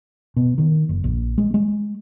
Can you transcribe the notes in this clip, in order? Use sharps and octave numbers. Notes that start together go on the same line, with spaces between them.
B2
D#3
F#1
A#1
G#3
G#3